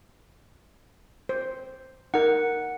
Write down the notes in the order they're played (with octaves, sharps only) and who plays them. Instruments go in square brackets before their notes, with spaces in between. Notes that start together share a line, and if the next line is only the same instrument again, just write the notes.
[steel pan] C5
[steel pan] D#4 A#4 [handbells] F#5